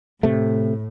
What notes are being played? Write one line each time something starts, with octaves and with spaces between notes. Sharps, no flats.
A2 C3 A3